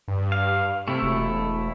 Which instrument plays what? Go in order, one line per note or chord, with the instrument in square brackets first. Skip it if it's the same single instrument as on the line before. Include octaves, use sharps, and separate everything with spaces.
[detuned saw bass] G2
[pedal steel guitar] F5
[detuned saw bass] C3 [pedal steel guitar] A3 E4
[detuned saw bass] E1